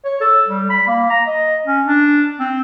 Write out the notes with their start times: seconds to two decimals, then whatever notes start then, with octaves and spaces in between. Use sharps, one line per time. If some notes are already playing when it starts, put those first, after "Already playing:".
0.05 C#5
0.21 A4
0.48 G3
0.70 B5
0.87 A#3
1.10 A#5
1.27 D#5
1.67 C#4
1.86 D4
2.40 C4